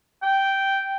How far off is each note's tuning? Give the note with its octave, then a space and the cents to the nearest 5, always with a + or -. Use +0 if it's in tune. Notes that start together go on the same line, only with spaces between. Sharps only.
G5 -5